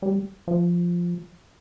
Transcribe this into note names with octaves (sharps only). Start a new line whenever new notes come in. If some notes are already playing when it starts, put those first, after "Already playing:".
G3
F3